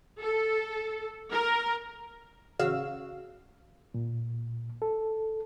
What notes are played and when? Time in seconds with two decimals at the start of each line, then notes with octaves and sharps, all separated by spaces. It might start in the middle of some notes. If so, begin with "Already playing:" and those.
0.21 A4
1.32 A#4
2.59 A1 C#3 F#4 F5 E6
3.94 A#2
4.82 A4